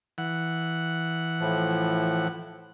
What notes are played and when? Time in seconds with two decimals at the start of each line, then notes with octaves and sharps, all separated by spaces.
0.18 E3 F#5
1.40 A2 F3